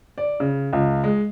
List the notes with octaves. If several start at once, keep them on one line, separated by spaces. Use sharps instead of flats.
D5
C#3
C#2
G#3